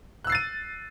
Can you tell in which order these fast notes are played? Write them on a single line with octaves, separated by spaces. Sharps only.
F#6 E6 C7 A6 D#7